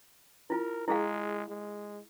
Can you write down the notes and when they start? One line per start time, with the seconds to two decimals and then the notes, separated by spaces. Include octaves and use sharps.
0.50 E4 F4 A#4
0.88 G#3 E4 G#4 F5
1.49 G#3